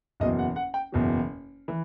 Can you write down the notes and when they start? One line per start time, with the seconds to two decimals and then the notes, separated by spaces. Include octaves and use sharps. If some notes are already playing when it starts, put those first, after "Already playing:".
0.20 F#1 E2 B2 F#3 D#5
0.39 F#5
0.56 F#5
0.74 G5
0.92 F#1 E2 B2 F#3
1.68 E3